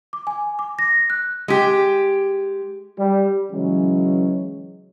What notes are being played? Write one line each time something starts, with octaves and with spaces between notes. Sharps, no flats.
D6
G#5
D6
A#6
F#6
G#3 G4
G3
C#3 E3 F#3 G#3 C#4